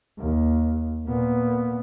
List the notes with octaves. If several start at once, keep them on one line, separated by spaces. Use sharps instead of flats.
D#2
A#2 B3